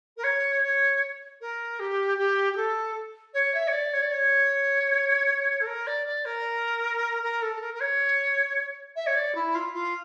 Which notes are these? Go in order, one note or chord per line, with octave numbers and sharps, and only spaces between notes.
A#4
C#5
C#5
A#4
G4
G4
G4
A4
C#5
E5
C#5
D5
C#5
D5
C#5
A4
A#4
D5
D5
A#4
A#4
A4
A4
A#4
A#4
C#5
E5
C#5
D5
E4
F4
F4